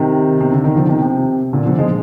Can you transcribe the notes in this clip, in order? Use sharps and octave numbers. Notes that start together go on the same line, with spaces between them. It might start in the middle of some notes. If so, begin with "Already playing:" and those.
Already playing: C3 D#3
C3
D3
D#3
D3 F3
C3 D#3
C3
A#2 D3
D3 F3
F3 G#3